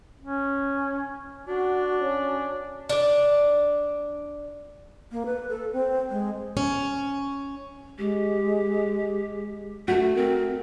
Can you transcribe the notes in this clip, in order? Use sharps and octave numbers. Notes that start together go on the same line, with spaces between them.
C#4
D4 F#4
C#4
D4 D5
A#3
B4
A4
C4
G#3
C#4
G#3 G4
A3 F#4 A4
C4 A#4